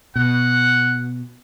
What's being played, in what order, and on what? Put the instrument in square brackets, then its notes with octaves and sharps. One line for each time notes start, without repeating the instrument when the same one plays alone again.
[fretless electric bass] B2 [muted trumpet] F#5